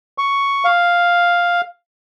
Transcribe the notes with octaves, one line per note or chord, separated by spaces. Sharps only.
C#6
F5